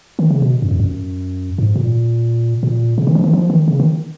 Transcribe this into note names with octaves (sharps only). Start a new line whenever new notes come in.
D#3
C#3
B2
F#2
F2
F#2
G#2
A#2
A#2
C#3
D#3
F3
D#3
F3
D#3
C#3
D#3